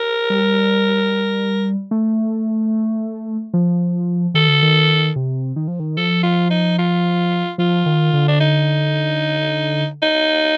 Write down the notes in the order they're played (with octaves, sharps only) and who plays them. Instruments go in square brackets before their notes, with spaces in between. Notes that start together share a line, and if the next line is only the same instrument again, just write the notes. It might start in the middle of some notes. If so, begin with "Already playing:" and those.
Already playing: [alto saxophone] A#4
[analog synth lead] G3
A3
F3
[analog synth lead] D#3 [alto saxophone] A4
[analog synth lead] D3
D#3
C3
D#3
F3
D#3
[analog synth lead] F3 [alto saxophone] A4
[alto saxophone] F4
D#4
F4
[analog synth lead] F3 [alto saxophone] F4
[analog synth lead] D#3
D3
[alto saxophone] D4
D#4
D#4